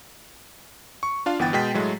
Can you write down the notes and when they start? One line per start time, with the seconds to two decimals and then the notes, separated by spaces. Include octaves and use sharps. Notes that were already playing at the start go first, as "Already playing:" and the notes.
1.03 C#6
1.26 D4 F4 F5
1.39 G1 E3 B3 F#5 G5 A6
1.53 B2 G#3 G5 B6
1.74 A2 F#3 G#3 A3